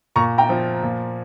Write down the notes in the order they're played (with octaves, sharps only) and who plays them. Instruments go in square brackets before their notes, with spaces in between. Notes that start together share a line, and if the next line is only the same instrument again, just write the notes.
[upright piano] A#2 A#5 C#6
G5 A#5
F3
A#2